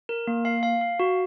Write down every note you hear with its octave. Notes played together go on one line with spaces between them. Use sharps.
A#4
A#3
F5
F5
F5
F#4